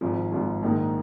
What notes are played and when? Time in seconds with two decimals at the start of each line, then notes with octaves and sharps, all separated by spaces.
0.01 G#1 G#2 F3
0.32 G#1 G#2 F3
0.62 A#1 G#2 D#3 G#3 D#4